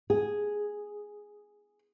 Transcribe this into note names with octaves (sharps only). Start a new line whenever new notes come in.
G#4